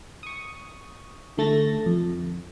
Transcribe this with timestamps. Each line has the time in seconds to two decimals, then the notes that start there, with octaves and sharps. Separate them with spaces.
0.23 C#6 D#6
1.37 D3 A3 A6 A#6
1.86 F2